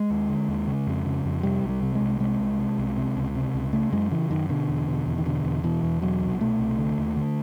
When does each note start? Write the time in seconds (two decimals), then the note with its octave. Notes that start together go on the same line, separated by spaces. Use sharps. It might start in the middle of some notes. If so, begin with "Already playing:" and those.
Already playing: G#3
0.10 D#2
0.29 D3
0.48 D#2
0.67 C#3
0.87 F2
1.06 C#3
1.25 F2
1.43 C3 G3
1.64 C2
1.69 G3
1.83 C3
1.95 G#3
2.01 C2
2.20 C3 G#3
2.40 C2
2.58 C3
2.78 C2
2.97 C3
3.16 C#2
3.35 C3
3.54 C#2
3.73 C#3 A3
3.92 F#2 G#3
4.11 C#3 E3
4.30 F#2 D#3
4.49 B2 D3
4.68 E2
4.87 B2
5.06 E2
5.18 D#3
5.25 B2 D3
5.44 E2
5.64 B2 E3
5.83 E2
6.01 B2 F#3
6.22 C2
6.40 B2 A3
6.59 C2
6.78 D3
6.98 D#2
7.16 D3